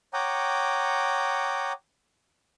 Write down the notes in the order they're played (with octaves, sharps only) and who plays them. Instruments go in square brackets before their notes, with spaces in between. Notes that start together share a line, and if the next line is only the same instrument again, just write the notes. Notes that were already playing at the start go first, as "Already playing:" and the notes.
[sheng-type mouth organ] C#5 F#5 G5 A#5 D6 D#6